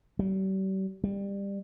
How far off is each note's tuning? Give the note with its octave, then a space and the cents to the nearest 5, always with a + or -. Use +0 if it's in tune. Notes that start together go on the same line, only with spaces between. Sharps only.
G3 -40
G3 +20